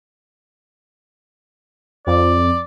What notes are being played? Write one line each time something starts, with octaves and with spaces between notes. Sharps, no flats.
F2 D5